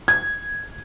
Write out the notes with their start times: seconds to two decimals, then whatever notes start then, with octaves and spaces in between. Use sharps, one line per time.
0.08 G#6